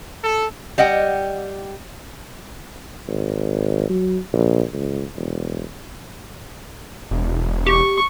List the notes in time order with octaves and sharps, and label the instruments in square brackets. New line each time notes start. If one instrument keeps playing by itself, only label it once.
[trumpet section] A4
[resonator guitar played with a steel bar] G3 D#5 F#5 G5
[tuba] G#1
F#3
A#1
C#2
E1
[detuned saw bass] E1
[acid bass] G4 [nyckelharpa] C#6